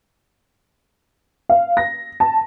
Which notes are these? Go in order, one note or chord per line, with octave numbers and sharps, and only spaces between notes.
F5
A#6
A5